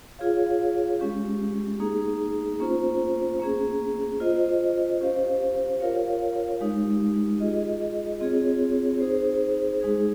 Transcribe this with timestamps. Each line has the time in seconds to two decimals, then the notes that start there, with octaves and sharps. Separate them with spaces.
0.19 F4 G#4 C#5 F5
1.00 G#3 C#4 G4
1.80 A#3 D#4 G#4
2.60 A#3 C#4 F4 C5
3.39 A#3 C#4 G#4
4.20 F4 C5 D#5
5.01 C#4 G4 C5 F5
5.80 F4 A#4 C#5 F5
6.60 G#3 D#4 G4
7.40 F4 G#4 D#5
8.21 C4 F4 G#4 C#5
9.00 D#4 G#4 C5
9.81 G#3 D#4 G#4